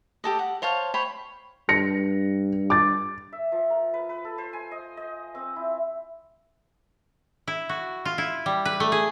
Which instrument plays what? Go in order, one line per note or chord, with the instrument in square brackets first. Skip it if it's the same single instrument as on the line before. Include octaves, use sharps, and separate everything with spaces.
[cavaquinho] G4 A4 D#5
F#5
C5 C#5 F5 A5
C5 C#5 G5 B5
[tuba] G2 [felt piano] A#6 C#7
[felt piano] D6 A6
[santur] E5
F3
A#4
B4
B4
A4
C5
G#5
D#5
D#5
C4
E4
[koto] E4
F#4
F4
E4
G3
B4
A3
G#4